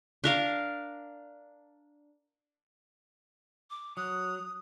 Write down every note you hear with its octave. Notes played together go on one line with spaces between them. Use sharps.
D4 A#4 F5
D6
F#3 D#6 F#6